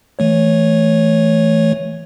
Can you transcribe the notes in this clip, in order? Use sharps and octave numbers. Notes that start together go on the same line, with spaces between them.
E3 A3 C#5